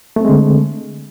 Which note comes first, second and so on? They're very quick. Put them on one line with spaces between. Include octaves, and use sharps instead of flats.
A3 C4 G#3 D3